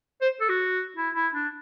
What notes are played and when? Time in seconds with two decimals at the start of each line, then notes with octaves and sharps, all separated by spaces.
0.22 C5
0.41 A4
0.49 F#4
0.97 E4
1.15 E4
1.34 D4